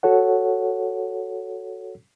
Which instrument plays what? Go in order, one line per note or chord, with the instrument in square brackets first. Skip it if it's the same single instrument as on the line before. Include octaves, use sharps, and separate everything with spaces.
[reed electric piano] F#4 A4 C#5 F#5